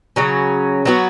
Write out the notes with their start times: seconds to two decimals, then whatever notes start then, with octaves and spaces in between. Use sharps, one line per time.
0.16 C#3 F#3 C#4
0.85 F#3 B3 F#4